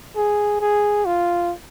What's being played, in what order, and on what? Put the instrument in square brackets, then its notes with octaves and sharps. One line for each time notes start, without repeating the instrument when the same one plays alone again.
[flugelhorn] G#4
G#4
F4